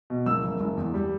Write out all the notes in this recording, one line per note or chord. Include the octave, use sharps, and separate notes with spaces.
B2
F#1 E6
F#1
F#1
E2
G3